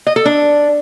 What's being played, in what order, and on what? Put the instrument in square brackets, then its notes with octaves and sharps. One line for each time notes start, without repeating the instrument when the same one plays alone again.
[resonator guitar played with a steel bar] D#5
A4
D4